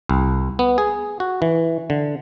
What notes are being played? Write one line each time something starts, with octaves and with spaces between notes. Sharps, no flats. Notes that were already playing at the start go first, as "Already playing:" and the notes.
C2
B3
G#4
F#4
E3
D3